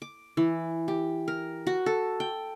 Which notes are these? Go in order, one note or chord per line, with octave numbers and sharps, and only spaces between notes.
D6
E3
G4
A#4
F#4
A4
G5